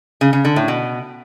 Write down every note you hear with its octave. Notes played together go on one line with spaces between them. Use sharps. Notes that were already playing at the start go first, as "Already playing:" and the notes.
C#3
C#3
D3
A2
B2